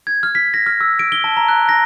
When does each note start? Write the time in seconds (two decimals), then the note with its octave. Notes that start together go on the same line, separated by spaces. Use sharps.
0.07 G#6
0.23 F6
0.35 B6
0.54 A#6
0.66 F6
0.81 E6
0.99 D7
1.12 G7
1.24 A5
1.37 A#5
1.49 F#6
1.69 A#6